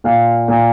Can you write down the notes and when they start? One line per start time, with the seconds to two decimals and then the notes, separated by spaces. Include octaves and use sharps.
0.04 A#2 F5
0.48 A#2